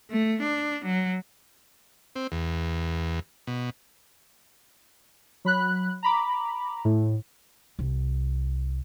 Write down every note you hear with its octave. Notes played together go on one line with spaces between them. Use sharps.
A3
D4
F#3
C4
E2
B2
F#3 B5 F#6
A#5 B5 D6
A2
C2